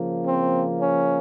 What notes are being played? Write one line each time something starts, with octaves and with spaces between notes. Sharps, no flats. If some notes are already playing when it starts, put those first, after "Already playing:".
Already playing: C#3 F3 A#3
C4
C#4